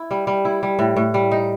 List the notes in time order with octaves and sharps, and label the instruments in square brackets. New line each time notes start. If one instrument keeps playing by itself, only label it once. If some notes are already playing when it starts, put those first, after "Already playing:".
Already playing: [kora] E4
G3
G3
E4
G3
A2
A2
G3
D#4